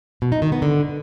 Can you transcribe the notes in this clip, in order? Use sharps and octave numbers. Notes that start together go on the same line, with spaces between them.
B2
D#4
D#3
B3
D3